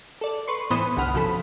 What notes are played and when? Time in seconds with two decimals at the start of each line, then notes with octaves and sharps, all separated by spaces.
0.21 A4 D5
0.48 B4 C6 C#6
0.70 A2 E3 B3 C5 B5 D#6
0.97 G1 C2 D3 F#5 B5 F6
1.14 B1 C#3 F3 A4 B5